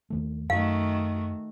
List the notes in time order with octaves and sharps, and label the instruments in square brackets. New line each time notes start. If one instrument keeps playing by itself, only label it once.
[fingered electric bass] D#2 D#3 A3
[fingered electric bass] F#2 [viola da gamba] D#3 A3 F#4 [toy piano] F5